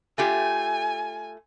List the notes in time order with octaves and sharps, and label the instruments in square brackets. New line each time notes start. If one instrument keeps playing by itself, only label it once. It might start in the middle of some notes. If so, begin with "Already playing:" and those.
[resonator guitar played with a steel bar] A3 F4 G4 [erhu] G#5